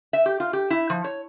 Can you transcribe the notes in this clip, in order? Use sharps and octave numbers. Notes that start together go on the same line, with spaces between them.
E5
G4
F4
G4
E4
F3
C#5